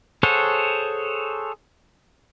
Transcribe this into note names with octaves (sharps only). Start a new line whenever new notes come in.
G#4 A4 C5 C#5 F#5